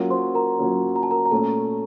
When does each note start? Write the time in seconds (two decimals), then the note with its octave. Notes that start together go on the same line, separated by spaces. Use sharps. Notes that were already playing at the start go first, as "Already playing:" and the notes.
Already playing: F#3 A#3 C#4 F4
0.10 C5 C6
0.35 A#4 A#5
0.58 F#3 A#3 C#4 F4
0.96 A#5
1.03 A5
1.11 A#4 A#5
1.26 A#5
1.31 A#2 A3 C#4 A4 A5